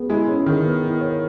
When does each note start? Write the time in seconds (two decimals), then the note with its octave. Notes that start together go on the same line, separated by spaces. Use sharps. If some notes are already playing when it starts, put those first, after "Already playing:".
Already playing: B3 G#4
0.10 G#3 E4
0.29 C#3 C#5
0.46 D#3 G#4
0.65 B3
0.83 E4
1.01 C#5